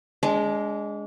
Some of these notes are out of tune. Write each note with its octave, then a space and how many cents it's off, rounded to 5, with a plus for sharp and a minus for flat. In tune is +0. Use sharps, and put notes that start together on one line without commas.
G#3 +0 D4 -30